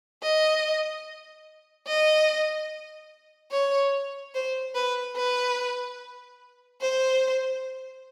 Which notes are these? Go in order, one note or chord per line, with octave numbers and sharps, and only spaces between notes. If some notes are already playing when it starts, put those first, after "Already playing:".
D#5
D#5
C#5
C5
B4
B4
C5